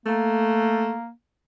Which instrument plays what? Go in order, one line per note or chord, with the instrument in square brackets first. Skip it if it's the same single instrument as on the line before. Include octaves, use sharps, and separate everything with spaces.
[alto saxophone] A3 [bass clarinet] A#3